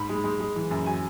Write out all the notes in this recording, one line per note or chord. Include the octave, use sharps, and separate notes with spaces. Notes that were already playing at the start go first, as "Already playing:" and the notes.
Already playing: G#2 B5
G#3
G#3
G#3
E3
F#2
F#3 G#5